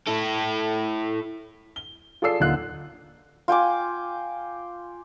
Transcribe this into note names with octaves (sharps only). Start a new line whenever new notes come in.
E4 A4
G7
F4 G#4 A4 D5 E6 C7
D#1 D3 D#4 F4 F#6
F4 G5 G#5 D6